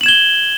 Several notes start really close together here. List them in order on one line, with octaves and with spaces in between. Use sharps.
F#7 E7 G#6 G7